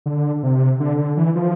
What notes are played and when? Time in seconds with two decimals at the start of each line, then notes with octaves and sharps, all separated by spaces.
0.06 D3
0.43 C3
0.80 D3
0.99 D3
1.17 E3
1.35 F3